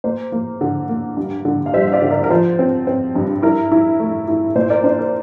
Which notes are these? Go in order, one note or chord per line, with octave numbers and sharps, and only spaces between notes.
A#3 C5
A#3
D3
A#3
G2
D3
F5
G3 C5 E5
E5
D5 F5
D3
A#4 D5
A#4
F3 C5
C4
C4
G2
E4 A#4
E4
A3
E4
A#2 C5
A#4 D5
D4 C5
A#4